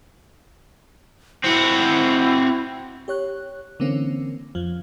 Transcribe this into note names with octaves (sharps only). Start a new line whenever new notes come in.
C4 E4 F#4
G4 C#5 F#6
D3 E3 A#3 C4 C#4
F2 F3